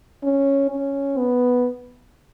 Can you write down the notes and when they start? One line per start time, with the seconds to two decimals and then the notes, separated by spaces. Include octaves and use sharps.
0.24 C#4
0.70 C#4
1.18 B3